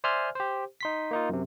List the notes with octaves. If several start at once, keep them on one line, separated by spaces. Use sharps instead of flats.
C5 D5 E5 G#5 C6 F6
G4 C5
D#4 C6 B6
A#3 D#4 F4
F#2 C3